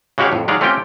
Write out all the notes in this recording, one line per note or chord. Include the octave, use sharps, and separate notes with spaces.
C#3 G#3 F#4 G4 C#5 F5
F2 A2
F#3 G#3 D#4 D5 F5
A3 C4 C#4 F4 G4 G5